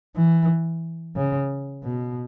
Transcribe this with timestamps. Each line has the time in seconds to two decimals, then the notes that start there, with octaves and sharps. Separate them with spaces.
0.16 E3
1.16 C#3
1.84 B2